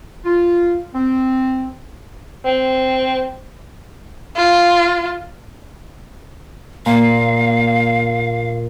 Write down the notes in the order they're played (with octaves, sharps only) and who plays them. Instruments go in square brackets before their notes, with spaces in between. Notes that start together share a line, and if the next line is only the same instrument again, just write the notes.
[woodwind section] F4
C4
[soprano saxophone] C4
[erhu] F4
[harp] A#2 F4 A#5 [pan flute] F5